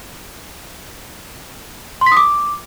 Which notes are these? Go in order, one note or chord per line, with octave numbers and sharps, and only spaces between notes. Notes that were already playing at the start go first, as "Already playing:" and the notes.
C6
B6
D#6
D6